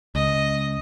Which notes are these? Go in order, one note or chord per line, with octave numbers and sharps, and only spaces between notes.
C#2 D#5